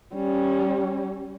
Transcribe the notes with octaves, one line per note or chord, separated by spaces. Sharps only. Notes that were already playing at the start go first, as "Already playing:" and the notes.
G3 C#4